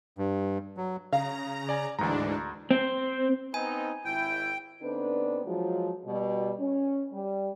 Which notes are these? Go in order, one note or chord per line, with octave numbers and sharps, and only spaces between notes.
G2
F#3
C#3 F5 A#5
D5 G#5
D2 G#2 E3 D4 A#5
C4
B3 C4 D#4 G#5
G#1 E4 G5
D3 B3 C4 D4 D#4 B4
F3 F#3 G#3
B2 G3
C#4
G3